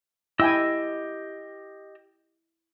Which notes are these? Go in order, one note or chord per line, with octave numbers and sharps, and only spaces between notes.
E4 G4 D#5 G5 G#5 E6